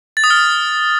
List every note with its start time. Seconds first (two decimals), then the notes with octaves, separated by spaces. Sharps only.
0.17 A6
0.24 D#6
0.30 F6
0.37 D#6